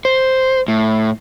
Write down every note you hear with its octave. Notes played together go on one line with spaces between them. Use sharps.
C5
A2